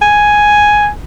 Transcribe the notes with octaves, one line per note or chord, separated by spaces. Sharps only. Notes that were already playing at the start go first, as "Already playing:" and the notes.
G#5